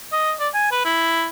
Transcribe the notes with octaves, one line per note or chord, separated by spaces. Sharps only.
D#5
D5
G#5
B4
E4